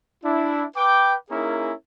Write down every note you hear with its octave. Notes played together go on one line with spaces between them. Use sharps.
D4 E4
B4 G5 D6
A#3 C#4 D#4 E4 G#4 A#4